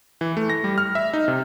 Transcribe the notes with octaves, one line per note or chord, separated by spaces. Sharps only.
E3
A3
A#6
G3
F6
E5
D#4
C3